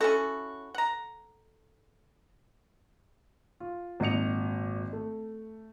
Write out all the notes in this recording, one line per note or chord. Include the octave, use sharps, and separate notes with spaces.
C#4 E4 F#4 A4
F#5 A#5
F4
G#1 A#2 D#5 C#7 F7
A3